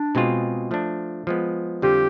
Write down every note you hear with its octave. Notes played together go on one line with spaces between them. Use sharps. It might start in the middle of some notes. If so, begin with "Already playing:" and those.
Already playing: D4
B2 G#3 C4 F4 G#4
F3 A3 D4
F3 G#3 B3
F2 D3 G3 C4 F4 G4